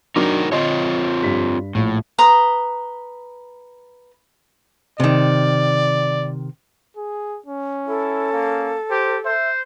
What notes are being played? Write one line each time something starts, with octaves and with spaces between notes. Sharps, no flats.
F#3 D4 D#4 F#4 A#4 D6
C4 F4 C#5 D#5
G2 B6
A#1 A2
B4 A#5 C6 D#6
C3 D#3 D5
G#4
C#4
E4 A4
A#3
G4 C5
C5 E5